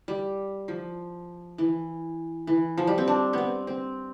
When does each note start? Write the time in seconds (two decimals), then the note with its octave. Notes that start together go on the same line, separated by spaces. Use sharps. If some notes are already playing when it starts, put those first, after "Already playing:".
0.08 G3
0.68 F3
1.58 E3
2.47 E3
2.78 F3
2.87 G3
2.98 C4
3.08 D4
3.33 B3 C4
3.67 C4